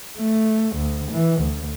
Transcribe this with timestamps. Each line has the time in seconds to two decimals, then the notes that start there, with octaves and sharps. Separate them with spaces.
0.18 A3
0.76 D2
1.12 E3
1.41 D2